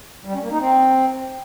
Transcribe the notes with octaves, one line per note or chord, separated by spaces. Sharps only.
G3
C#4
A#3
D#4
C4